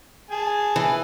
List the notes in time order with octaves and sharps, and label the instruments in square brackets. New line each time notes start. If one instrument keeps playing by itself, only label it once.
[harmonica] G#4 G#5 A5
[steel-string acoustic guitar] E3